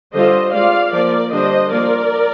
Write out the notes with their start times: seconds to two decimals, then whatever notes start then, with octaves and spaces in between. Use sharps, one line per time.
0.14 D3 G3 D4 F4 C5 D#5
0.53 G#3 C4 F4 D5 F5
0.92 F3 A#3 F4 A#4 D5
1.31 D3 G3 D4 C5 D#5
1.71 F3 A#3 F4 A#4 D5